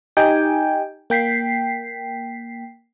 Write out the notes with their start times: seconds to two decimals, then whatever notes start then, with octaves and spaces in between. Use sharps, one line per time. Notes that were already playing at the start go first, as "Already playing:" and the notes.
0.17 D#4 G4 G5 G#5
1.10 A#3 G5 B6 C7